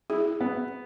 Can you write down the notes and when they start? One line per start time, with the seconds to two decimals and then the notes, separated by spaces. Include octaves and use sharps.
0.10 E4 G#4
0.41 B3